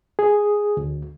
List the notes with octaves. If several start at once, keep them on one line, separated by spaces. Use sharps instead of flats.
G#4
D2